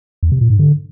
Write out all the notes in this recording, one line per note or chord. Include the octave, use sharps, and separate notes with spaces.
E2
C3
A#2
G#2
D3